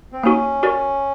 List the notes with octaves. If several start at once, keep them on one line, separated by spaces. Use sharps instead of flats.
C4
A#3 C#4 D#4 F#4
F#4 A#4 D5